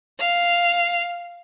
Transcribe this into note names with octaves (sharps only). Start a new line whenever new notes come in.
F5